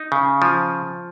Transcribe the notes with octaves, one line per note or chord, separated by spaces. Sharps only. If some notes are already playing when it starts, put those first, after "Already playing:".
Already playing: D#4
C#3
F3